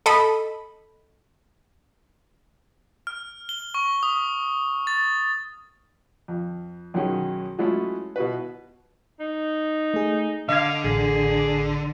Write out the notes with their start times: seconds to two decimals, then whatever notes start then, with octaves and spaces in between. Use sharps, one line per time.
0.06 A4 D#5 B5
3.07 F6
3.49 G7
3.74 C#6
4.03 D#6
4.87 A6
6.28 F2
6.94 B1 F#2 D#3 F#3 C#4 G#4
7.58 F#3 G#3 A3 C#4 E4 F4
8.16 B2 E4 F#4 B4
9.20 D#4
9.94 A3 G#4
10.49 D3 D#5 F5 G#6
10.85 A1 G#4